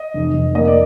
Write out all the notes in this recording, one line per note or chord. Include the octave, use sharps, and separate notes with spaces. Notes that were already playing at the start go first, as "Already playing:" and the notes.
Already playing: D#5
F1
F1
A#3 D#5
D5